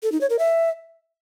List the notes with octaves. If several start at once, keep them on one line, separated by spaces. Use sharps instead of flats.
A4
D#4
C#5
A#4
E5